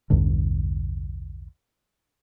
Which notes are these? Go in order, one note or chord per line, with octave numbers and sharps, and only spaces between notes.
A#1 E2 G2 D3